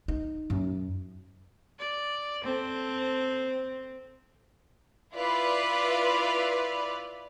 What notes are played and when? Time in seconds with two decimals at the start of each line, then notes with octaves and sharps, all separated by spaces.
0.08 D#4
0.50 F#2
1.79 D5
2.44 C4 A4
5.15 E4 F4 B4 D5 F5